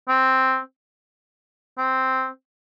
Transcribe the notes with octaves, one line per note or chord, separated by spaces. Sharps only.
C4
C4